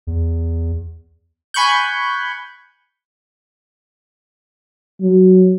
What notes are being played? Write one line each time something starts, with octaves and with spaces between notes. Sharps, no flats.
E2
G#5 B5 C#6 F#6 G6
F#3